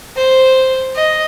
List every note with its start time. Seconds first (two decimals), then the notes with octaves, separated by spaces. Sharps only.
0.16 C5
0.96 D#5